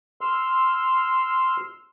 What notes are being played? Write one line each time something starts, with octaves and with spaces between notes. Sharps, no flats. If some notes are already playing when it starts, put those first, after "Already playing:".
C6 E6 F6